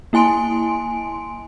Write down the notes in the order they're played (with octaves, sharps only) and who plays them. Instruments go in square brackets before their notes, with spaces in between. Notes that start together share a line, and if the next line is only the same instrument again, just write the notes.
[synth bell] A#3 E4 G#5 C6 D7